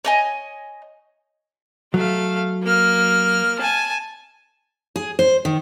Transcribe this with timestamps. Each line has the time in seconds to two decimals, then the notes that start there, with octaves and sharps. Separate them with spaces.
0.05 C#5 D#5 G#5
1.94 F#3 A3 F5
2.63 A#3 F6
3.59 G#5 A5
4.96 G#4
5.19 C5
5.45 D#3